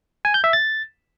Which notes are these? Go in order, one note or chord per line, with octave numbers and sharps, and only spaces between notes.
G#5
G6
E5
A6